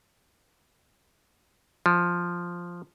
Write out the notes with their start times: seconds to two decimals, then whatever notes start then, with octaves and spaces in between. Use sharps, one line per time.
1.86 F3